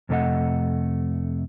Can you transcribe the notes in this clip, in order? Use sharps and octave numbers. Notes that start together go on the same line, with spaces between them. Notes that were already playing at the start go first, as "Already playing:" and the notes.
F2 C3 A3 D4 D#5 F#5